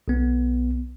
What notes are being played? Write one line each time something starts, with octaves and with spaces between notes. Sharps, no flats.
B1 B3